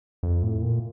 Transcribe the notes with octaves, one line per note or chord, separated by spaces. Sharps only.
F2
A2
A#2